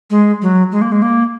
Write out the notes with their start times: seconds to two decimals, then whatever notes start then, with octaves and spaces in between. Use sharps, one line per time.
0.10 G#3
0.42 F#3
0.72 G#3
0.82 A#3
0.92 G#3
1.02 A#3